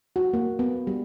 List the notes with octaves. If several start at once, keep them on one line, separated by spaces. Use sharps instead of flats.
F#4
A#3
B3
G3